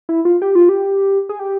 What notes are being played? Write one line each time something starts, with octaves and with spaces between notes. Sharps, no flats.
E4
F4
G4
F4
G4
G#4
G4